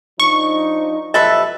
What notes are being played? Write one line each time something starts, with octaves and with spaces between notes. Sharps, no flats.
F3 D4 D#4 C#6
B1 F3 G4 A4 B4 D#5 E5